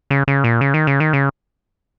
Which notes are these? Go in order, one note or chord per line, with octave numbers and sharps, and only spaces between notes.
C#3
C#3
A#2
C#3
D#3
C#3
D#3
C#3